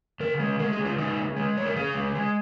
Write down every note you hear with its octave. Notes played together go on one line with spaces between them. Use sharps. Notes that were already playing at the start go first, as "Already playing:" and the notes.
C#3 A#4
G#3
G#3 A#4
G#4
C#3
F4
G#3 D#4
C#3
G#3
C#3 C#5
A#4
C#3 G#4
G#3
G#3